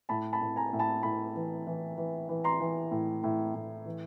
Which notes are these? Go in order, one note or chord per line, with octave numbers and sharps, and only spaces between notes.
A2 A5 B5
A5 B5
A2
G#5 A#5
A2
A5 B5
A2 A5 B5
E3
E3
E3
E3
A#5 C6
E3
A2
A2
A2
E3